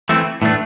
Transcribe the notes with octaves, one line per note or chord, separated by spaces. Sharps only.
E3 A3 C4 E4
A2 E3 A3 D4